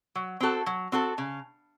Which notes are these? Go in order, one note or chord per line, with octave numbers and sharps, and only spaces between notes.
F#3
C4 F#4 A4
F#3
C4 F#4 A4
C#3